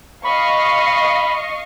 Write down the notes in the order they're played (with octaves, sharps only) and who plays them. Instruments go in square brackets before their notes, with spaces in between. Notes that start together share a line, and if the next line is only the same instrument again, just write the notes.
[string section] D#5 F5 C#6 [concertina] B5